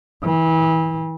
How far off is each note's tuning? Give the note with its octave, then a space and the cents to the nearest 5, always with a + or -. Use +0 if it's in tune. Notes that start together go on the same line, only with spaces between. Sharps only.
E3 -30